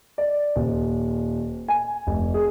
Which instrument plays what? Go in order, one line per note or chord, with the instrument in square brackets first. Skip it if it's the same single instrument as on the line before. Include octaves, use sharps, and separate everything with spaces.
[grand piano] D5
D#1
G#5
F1
G#4